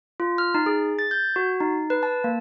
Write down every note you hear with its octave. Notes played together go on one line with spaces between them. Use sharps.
F4
F6
D#4
G#4
A6
G6
F#4
D#4
B4
A5
A#3